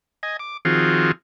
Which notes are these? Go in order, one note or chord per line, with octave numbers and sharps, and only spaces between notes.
D#5 G#5
D6
D#3 F3 C4 F4 F#4 G#4